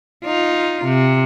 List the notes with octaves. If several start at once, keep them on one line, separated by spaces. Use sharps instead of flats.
D#4 F4
C3